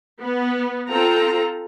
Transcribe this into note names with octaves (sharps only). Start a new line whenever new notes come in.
B3
C4 F4 A4 A#5